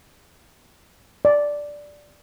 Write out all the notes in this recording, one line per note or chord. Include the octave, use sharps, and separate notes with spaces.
D5